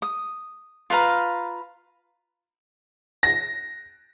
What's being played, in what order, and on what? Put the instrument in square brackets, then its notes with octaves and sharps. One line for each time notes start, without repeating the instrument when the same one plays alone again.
[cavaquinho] D#6
F4 B4 F5 A#5
[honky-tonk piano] A#6